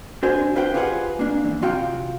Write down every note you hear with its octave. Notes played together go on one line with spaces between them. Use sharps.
D4 F#4 C5 G#5
F4 B4 C5 G5
F4 G4 G#4 B4 D5 F#5
A#3 D4
E2
C3 F4 F#4 F5 G5